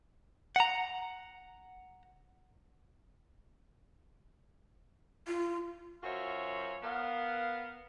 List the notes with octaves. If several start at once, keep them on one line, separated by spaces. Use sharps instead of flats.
F#5 A#5
F4
F#2 F4 F#4 C5 C#5 E5
B3 A#4 F5